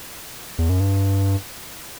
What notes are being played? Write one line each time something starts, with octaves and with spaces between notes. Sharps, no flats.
E2
F#2
G2